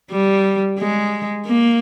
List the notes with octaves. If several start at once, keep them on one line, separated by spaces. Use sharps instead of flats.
G3
G#3
A#3